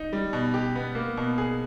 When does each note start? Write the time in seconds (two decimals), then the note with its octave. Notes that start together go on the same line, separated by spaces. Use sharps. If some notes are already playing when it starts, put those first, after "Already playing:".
Already playing: D#4
0.13 G3
0.33 B2
0.54 G4
0.75 B3
0.95 A#3
1.17 B2
1.38 G#4